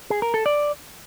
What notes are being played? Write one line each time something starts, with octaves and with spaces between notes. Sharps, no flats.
G#4
A#4
A4
D5